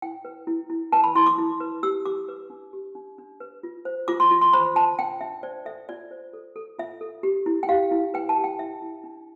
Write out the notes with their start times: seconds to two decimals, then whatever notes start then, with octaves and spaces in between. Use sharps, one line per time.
0.02 E4 G5
0.25 B4
0.47 E4
0.70 E4
0.92 B4 A5
1.04 B5
1.15 E4 C6
1.26 D6
1.38 E4
1.60 B4
1.83 G4 E6
2.06 G4 D6
2.28 B4
2.50 D4
2.73 G4
2.95 D4
3.18 D4
3.40 B4
3.63 F4
3.85 C5
4.08 F4 D6
4.20 C6
4.31 F4
4.41 C6
4.53 C5 B5
4.75 F4 A5
4.99 D4 G5
5.21 D4 E5
5.43 C5 D5
5.65 A4 E5
5.89 F4 D5
6.11 C5
6.33 A4
6.56 A4
6.79 F4 E5
7.01 A4
7.23 G4
7.46 E4
7.63 G5
7.69 G4 F5
7.91 E4
8.14 B4 G5
8.29 A5
8.37 G4
8.44 G5
8.59 E4 E5
8.82 E4
9.04 D4